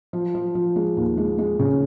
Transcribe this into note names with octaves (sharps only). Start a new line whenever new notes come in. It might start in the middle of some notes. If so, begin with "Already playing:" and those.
F3
F3
F3
G#3
D#2
G#3
G#3
C#3